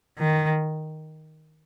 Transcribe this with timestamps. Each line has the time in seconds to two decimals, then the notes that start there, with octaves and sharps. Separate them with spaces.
0.19 D#3